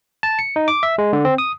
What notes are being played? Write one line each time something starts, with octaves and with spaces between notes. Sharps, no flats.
A5
C#7
D#4
D6
E5
G#3
D3
C4
D#6